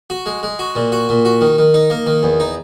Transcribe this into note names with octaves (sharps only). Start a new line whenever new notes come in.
F#4
G#3
G#3
F#4
A#2
F#4
A#2
F#4
D#3
D#3
D#4
A#3
D#3
E2
D#4